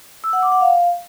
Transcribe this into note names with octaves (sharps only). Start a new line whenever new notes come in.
E6
F#5
D6
F#5
F5